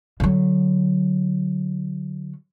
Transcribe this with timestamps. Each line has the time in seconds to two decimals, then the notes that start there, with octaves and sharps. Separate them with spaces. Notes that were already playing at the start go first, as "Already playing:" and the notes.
0.20 D3 F#3